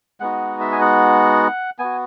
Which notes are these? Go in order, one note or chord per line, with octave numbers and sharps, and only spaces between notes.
G#3 B3 D#4 F#4 F#5
E5
G#5
F#5
B3 F#4 G#5